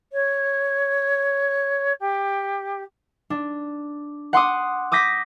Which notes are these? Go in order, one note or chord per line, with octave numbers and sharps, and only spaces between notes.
C#5
G4
D4
F#5 C6 D6 D#6
D6 D#6 G6 A#6 B6